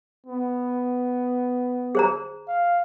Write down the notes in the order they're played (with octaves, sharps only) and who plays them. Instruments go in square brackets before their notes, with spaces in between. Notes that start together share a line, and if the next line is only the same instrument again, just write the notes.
[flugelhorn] B3
[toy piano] G#4 C5 A#5
[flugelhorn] F5